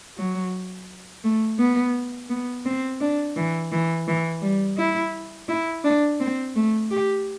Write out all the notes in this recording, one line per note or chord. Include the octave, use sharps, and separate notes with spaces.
F#3
A3
B3
B3
C4
D4
E3
E3
E3
G3
E4
E4
D4
C4
A3
G4